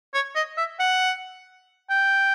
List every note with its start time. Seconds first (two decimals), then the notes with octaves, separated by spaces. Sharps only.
0.14 C#5
0.35 D#5
0.57 E5
0.79 F#5
1.90 G5